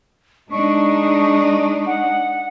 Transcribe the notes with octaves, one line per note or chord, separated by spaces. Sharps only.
G#3 D4 D#4 C#6
F#5